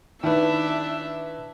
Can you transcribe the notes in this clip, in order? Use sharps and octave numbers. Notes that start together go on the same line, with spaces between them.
D#3 D4 E4 B4 E5